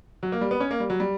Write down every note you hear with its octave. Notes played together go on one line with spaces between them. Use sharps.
F#3
A#3
G3
B3
C#4
A#3
G3
F#3
G3